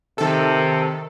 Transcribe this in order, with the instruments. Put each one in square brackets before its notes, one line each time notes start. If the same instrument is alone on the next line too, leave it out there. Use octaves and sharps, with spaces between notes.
[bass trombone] C3 [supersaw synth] D#3 A4